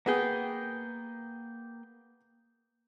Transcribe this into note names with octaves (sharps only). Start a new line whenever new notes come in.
A#3 B3 G#4 G5